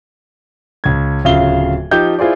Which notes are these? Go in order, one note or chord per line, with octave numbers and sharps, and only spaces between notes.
C#2 G#6
D1 C#3 F4 E5 F5 G7
F3 D#4 G4 G6
E4 F4 G#4 C5 D5